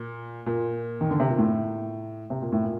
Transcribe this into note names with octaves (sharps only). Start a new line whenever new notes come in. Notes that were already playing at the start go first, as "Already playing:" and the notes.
Already playing: A#2
A#2
D#3
D3
C3
A#2
A2
C3
A#2
A2
A#2